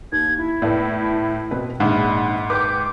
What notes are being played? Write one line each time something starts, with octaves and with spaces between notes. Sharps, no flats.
D#2 G#6
E4
A2 A3 B3 D5
B2 C4 B4
A#1 G#2 D#3 F#5 B5
B4 G5 D6 G6